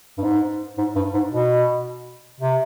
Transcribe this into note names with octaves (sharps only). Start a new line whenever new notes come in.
G2
G#2
G#2
G2
G#2
B2
C3